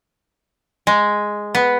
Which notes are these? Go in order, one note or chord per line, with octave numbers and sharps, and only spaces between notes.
G#3
B3